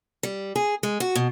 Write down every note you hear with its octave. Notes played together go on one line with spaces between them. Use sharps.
G3
G#4
G#3
F#4
B2